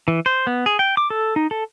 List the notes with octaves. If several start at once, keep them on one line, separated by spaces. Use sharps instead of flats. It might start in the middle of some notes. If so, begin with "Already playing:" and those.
E3
C5
B3
G#4
G5
D6
A4
D#4
A4